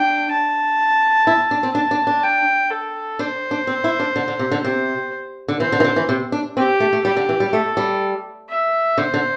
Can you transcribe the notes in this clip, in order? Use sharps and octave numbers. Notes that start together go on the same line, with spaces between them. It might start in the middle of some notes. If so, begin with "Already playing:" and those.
Already playing: D4 G5
A5
E4
D4
C4
D4 A5
D4
D4
G5
A4
D4 C5
D4
C4
E4
D4
D3
D3
C3
D3
C3 C5
D3
E3 C5
D3
E3
D3
E3
C3
D4
C4 G4
A3
A3
G3 G4
D3
E3
G3
A3 A4
G3
E5
D3 C5
D3